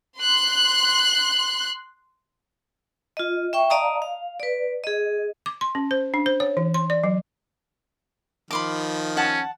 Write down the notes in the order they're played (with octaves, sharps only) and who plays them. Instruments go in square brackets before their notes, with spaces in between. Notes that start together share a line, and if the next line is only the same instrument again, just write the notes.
[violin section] C6 F#6
[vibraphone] F4 D#5
E5 G5 C#6
D5 D#5 F5 A5 A#5 D#6
F5
B4 D5
G#4 D#5
[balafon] D6
C6
C#4
C5
D4
C5
C#5
E3
C6
D5
F#3
[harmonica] D#3 F3 [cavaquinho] B5 C6 D6
[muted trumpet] C#4 [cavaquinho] F#5 A5